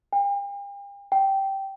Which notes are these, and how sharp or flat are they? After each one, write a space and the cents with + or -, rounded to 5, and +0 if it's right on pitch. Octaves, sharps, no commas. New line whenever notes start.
G5 +40
G5 -10